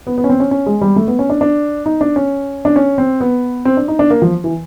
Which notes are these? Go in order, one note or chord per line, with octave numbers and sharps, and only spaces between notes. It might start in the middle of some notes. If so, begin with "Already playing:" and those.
B3
B3
C#4
C4
C#4
C#4
G#3
G3
A3
B3
C#4
D4
D4
D#4
D4
C#4
D4
C#4
C4
B3
C4
D4
D#4
D4
A#3
F3
E3